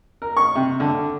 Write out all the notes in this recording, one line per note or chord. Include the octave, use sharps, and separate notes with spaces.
A#4
C#6
C3
D3